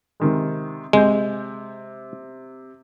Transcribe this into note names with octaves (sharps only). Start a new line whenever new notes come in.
C3 D#3 G#3
C3 G#3 G6